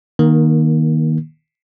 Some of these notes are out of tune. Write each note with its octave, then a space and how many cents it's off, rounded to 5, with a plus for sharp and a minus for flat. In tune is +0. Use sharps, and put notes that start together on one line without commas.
D#3 +0 A#3 +25